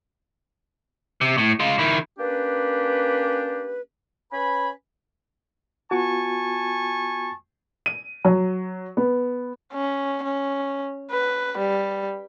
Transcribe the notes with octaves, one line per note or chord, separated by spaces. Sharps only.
C3
A2
G#3 F4
D#3 E4
A#3 C#4 D4 G4 B4
C#4 B4 G#5 B5
B3 F4 F#4 G#5 A5 C#6
D#7
F#3
B3
C#4
C#4
B4
G3